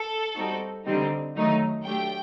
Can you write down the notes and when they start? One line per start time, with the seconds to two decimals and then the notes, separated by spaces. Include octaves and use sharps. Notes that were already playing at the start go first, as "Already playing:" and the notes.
Already playing: A4
0.35 G3 C4 D#4 F#4
0.85 D3 G3 C4 D#4
1.35 D#3 F#3 A3 D#4
1.85 F#3 A3 D4 G4 G5